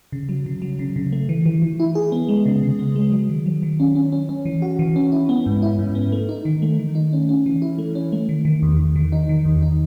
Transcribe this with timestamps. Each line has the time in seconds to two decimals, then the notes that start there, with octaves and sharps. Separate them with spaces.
0.12 C#3
0.29 F#3
0.46 C#3
0.62 F#3
0.79 C#3
0.96 C#3
1.12 A3
1.29 E3
1.46 E3
1.62 E3
1.80 E4
1.95 G#4
2.12 B3
2.28 G#3
2.46 C#3
2.63 C#3
2.79 B3
2.96 G#3
3.12 F#3
3.30 D#3
3.46 F#3
3.63 D#3
3.80 C#4
3.95 C#4
4.12 C#4
4.29 C#4
4.45 E3
4.62 F#4
4.79 E3
4.96 C#4
5.12 E4
5.29 B3
5.46 G#2
5.62 E4
5.79 G#2
5.95 B3
6.12 A3
6.29 D#4
6.45 D#3
6.62 A3
6.79 D#3
6.95 D#4
7.13 C#4
7.29 C#4
7.46 E3
7.62 E4
7.78 A3
7.95 C#4
8.12 A3
8.29 D#3
8.45 D#3
8.62 E2
8.80 E2
8.96 D#3
9.12 D#4
9.29 D#3
9.45 E2
9.62 D#4